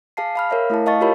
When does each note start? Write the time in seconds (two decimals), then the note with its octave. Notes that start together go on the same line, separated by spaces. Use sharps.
0.17 G#4 F5 A5 C7
0.36 F5 B5 F6
0.50 A#4 C#5 E5 F5
0.70 A3 E4 G#4 A5
0.86 D#5 F5 A5 C#6 A6
1.01 F4 G4 A#4 C#5 B5